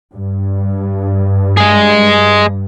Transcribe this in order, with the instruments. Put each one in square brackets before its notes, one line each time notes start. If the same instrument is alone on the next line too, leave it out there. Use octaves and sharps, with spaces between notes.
[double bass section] G2
[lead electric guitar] G#3 G#4